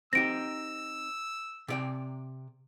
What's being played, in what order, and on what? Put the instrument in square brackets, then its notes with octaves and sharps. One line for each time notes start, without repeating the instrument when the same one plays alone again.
[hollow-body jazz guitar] C4 D#4 G4 [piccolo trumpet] E6 [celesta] A#6 D7
[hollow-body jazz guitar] C3 D5 G5